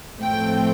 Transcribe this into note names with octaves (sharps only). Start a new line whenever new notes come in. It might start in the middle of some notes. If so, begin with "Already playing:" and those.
A2 F3 A3 C4 G5